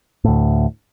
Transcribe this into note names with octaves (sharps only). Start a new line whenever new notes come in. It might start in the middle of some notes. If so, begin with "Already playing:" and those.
D2 A2